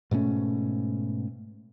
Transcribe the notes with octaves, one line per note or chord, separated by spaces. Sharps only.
G#2 B2 A3 C#4